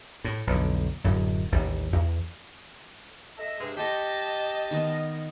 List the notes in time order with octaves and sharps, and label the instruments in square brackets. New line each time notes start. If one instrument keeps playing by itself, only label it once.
[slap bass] A2
B1 F2 D3
D1 F#2
A1 D#2 G3
E2
[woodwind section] A4 D#5 E5
[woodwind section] G2 C3 C5 [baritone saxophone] G#3
[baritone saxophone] G4 [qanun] A4 C5 [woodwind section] D#5 [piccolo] A5
[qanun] D#3 B3